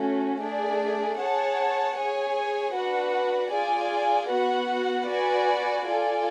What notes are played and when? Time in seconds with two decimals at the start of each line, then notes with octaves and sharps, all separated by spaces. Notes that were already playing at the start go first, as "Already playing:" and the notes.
Already playing: A3 C#4 F#4
0.41 A3 D4 G#4 D5
1.19 G#4 C#5 F#5 A5
1.96 G#4 C#5 G#5
2.75 D4 F#4 B4 F#5
3.52 F4 G#4 D5 G#5
4.29 B3 F#4 B4 F#5
5.08 F#4 B4 D5 G#5
5.86 F4 A4 D5 G#5